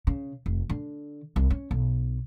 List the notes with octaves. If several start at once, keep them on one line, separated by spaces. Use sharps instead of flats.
C#3
F1
D3
C2
C#4
B1